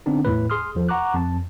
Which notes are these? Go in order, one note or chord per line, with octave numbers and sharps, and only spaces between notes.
D3 B3 C4 D4 D#4
E2 A2 B4
G#4 C6 D#6 F6
E2 F3 A4
F#5 A#5 C#6 D6 F#6
F2 A5